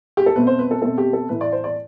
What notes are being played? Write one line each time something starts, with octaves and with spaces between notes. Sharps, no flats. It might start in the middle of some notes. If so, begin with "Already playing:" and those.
G4
A4
B2 A3 C4 B4
C5
B4
A4
B2 A3 C4 A4
G4
A4
A2 E3 A3 B4
D5
C5
D5